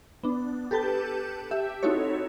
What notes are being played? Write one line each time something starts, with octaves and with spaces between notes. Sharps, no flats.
B3 D4
G4 A4 B4 A5 G6
G4 E5
C4 D#4 E4 F#4 A4 C#5